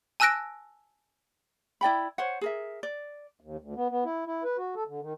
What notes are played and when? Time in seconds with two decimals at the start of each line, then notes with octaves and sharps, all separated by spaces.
0.20 G#5 A5 E6 F#6 A#6 D7
1.81 E4 D5 G5 B5
2.18 C5 C#5 F#5
2.41 G#4 A#4 E5
2.83 D5
3.40 D#2
3.60 D2
3.76 B3
3.90 B3
4.05 E4
4.26 E4
4.44 B4
4.58 F#4
4.76 A4
4.88 D3
5.01 D#3